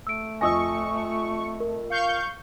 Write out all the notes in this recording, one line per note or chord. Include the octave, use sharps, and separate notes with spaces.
A3 E6 D7
F2 D#5 G#5 C#6 D#6 E6 A#6
A#4
F5 C#6 G6